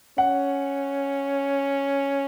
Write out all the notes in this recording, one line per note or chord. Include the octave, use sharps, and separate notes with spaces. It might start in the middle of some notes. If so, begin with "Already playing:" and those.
C#4 F#5